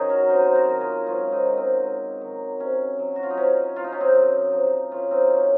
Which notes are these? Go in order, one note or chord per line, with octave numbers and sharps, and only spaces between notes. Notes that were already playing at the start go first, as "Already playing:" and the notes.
Already playing: D#3 F#3 C#4 D#4 G#4
F#4 A#4
C3 G#4 C5
C5
F#4 A#4
D#3 F#3
F4 G#4
G#2 C#4 F4
C4 D#4
D#3 F#3
C4
G#2
D#3 F#3
C3 C#4
F#3
F#4
F4
D#4
C3 C#4
F#3 F4
D#4
C#4
C4 D#4
F#2
F3
F#2 C#4 F4
C4 D#4
D#3 F#3 C#4